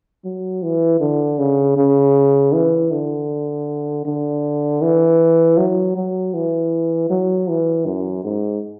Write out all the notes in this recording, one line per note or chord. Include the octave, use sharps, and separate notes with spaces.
F#3
E3
D3
C#3
C#3
E3
D3
D3
E3
F#3
F#3
E3
F#3
E3
F#2
G#2